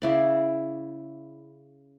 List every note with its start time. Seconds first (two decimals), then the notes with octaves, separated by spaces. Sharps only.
0.02 C#3 E4 D5